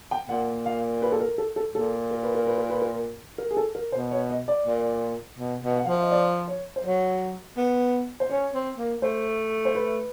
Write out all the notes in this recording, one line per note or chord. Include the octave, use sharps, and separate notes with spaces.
G5
A#2 F#5
F5
B4
A4
A#4
A4
A4
A#2 A4
A#4
B4
A#4
B4
A#4
B4
A#4
A#4
G#4
A4
A#4
B2 C5
C#5
D#5
D5
A#2
B2
B2
F#5
F3 F5
E5
D#5
D5
C#5
C5
F#3 C#5
B3
C5
C#4 C#5
C4
A#3
A3 C5
C5
B4